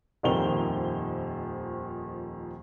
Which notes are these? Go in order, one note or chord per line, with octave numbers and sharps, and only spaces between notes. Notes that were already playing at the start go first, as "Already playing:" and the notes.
D#1 F2 D#3 C5 F7 G7